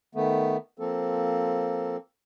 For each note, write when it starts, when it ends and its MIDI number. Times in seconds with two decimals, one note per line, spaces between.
0.15 0.57 51
0.15 0.57 57
0.15 0.57 59
0.79 1.97 53
0.79 1.97 58
0.79 1.97 60
0.79 1.97 69